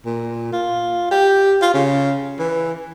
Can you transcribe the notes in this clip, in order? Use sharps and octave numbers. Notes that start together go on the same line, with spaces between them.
A#2
F4
G4
F4
C#3
E3